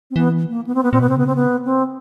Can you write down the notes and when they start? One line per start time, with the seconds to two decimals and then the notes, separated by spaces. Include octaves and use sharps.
0.11 C4
0.16 E3 B3
0.49 A#3
0.67 B3
0.75 C4
0.83 B3
0.92 A#2 C4
1.00 B2 B3
1.08 C3 C4
1.16 C#3 B3
1.27 C4
1.35 B3
1.65 C4